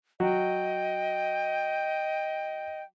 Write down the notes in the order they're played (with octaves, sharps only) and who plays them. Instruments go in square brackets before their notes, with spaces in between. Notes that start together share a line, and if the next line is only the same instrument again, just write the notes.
[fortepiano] F#3 [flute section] D#5 G5